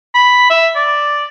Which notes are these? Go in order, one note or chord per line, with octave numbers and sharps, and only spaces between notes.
B5
E5
D5